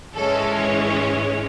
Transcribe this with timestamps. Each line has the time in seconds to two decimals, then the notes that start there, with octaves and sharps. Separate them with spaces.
0.13 G#2 E3 G#3 C#4 A4
0.56 C#5